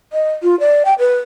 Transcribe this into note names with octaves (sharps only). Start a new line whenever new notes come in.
D#5
F4
D5
G5
B4